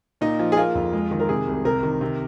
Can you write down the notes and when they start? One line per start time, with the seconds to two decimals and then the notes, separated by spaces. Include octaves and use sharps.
0.21 A#2 D#4
0.39 F3
0.52 G#4
0.57 A#3 F4
0.75 F2
0.93 G#3
1.11 D#3
1.20 A#4
1.29 C3 G#4
1.47 C2
1.65 C3 A#4
1.83 D#3
2.01 C3